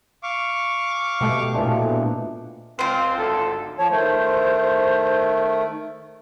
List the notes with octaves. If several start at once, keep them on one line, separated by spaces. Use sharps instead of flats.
F5 C#6 D6
B2 A3 G4 B4 D#5
A#2 E3 F3 D4
C#2 C4 F4 C5
G#1 D2 A4
F3 C#5 A5
D#3 A3 C5